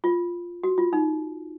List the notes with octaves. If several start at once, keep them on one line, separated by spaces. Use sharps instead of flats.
F4
F#4
F4
D#4